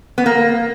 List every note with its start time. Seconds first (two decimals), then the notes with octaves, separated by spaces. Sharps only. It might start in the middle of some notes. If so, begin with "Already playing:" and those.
0.18 B3
0.26 A#3